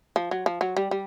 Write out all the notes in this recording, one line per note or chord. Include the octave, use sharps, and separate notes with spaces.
F3
F#3
F3
F#3
G3
G3